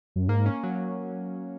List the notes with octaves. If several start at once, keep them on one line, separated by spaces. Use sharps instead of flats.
F#2
G#2 A#3
C#4
F#3